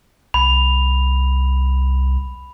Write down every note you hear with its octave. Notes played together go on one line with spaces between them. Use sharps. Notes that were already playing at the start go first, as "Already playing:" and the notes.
C2 B5 F7